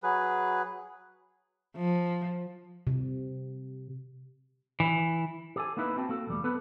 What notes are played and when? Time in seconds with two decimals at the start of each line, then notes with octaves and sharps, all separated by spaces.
0.03 F#3 G#4 B4
1.76 F3
2.87 C3
4.80 E3
5.56 G4 A4 G#5
5.77 A#3 B3 D#4 E4 G#4 B4
5.96 C4 F#4 G5 A5
6.09 A#3 F#4 A4
6.27 B1 E2 G3 A3
6.44 B3 A4 B4